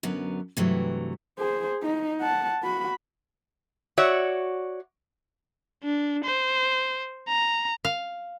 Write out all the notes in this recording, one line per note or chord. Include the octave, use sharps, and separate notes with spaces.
F#2 D3 F#3 B3
G2 C3 E3 F#3 A3
G#4 C5
D#4
F#5 A5
F#4 B5
F#4 C#5 D5 E5
D4
C5
A#5
F5